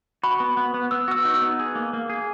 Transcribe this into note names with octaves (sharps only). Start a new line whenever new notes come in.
F#4 B5
B3
B3
B3
B3 E6
F#4 E6
D#4
B3
G#4
A#3
A#3
G#4